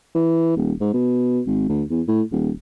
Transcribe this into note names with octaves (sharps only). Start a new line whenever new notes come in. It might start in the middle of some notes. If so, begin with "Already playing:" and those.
E3
D#1
G#2
B2
G#1
D2
E2
A2
D#1